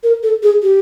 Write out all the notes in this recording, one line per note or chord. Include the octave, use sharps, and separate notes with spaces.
A#4
A4
G#4
G4